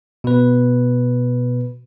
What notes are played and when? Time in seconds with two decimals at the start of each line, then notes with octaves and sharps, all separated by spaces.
0.24 B2 B4